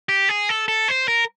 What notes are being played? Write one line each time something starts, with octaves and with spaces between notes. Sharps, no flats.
G4
G#4
A4
A4
C5
A#4